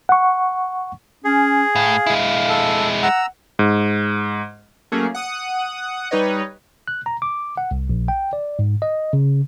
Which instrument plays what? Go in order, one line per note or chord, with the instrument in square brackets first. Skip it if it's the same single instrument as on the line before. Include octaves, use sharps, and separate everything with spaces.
[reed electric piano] F#5 C#6
[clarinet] C#4 [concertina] G#4
[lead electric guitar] A2 [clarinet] F5
[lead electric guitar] G#3 E4
[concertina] A4
[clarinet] F#5 [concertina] A#5 E6
[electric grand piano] G#2
[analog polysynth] F#3 A3 A#3 C#4 G#4
F#5 D#6
G3 D#4 B4 C#5 D#5
[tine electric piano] F#6
A#5
D6
F#5
C2
A#1
G5
D5
G#2
D#5
C#3